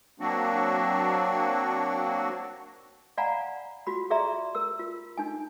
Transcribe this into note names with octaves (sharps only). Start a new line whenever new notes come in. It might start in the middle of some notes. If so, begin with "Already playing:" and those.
F#3 A#3 C4 D4 F#4
D5 F5 F#5 G#5 A#5 B5
F4 F#4 B5
G#4 D5 E5 A#5 C6
A#4 E6
F4
D4 D#4 G#5